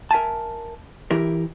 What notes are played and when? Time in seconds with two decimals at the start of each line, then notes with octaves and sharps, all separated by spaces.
0.11 A#4 E5 G#5 A5
1.11 E3 E4 G4 A#4